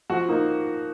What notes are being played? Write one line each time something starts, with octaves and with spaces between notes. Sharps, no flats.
F3 F#4
A#3 D#4